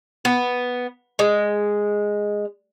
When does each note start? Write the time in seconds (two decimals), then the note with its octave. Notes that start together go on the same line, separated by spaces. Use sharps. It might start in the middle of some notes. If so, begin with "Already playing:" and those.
0.25 B3
1.19 G#3